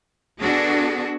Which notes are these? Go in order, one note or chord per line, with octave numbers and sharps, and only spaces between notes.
B3 D4 F#4 G#4 A4